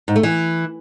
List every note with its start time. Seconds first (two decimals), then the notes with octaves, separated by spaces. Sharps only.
0.08 G#2
0.16 A3
0.23 E3